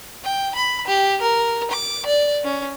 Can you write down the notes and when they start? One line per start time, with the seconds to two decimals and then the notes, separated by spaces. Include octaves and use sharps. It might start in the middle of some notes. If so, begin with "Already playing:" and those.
0.24 G5
0.55 B5
0.87 G4
1.21 A#4
1.71 D6
2.06 D5
2.44 C#4